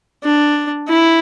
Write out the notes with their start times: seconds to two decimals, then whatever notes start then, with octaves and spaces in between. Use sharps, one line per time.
0.24 D4
0.88 E4